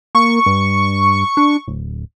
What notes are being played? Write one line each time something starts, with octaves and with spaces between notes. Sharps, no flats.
A#3 C#6
G2
D4
D1